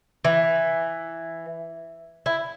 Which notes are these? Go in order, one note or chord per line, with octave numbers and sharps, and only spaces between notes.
E3
E4